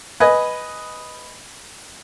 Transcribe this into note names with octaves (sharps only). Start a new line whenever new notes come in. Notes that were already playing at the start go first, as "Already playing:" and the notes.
B4 D#5 G#5